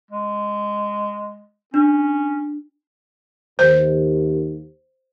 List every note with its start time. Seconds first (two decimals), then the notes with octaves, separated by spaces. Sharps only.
0.11 G#3
1.74 C#4 D4
3.59 D#2 C5